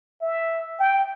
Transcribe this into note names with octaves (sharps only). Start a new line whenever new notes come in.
E5
G5